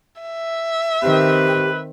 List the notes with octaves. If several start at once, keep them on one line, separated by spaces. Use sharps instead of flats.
E5
D#3 C4 G4 B4